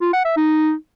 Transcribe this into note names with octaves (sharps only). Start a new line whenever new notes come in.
F4
F#5
E5
D#4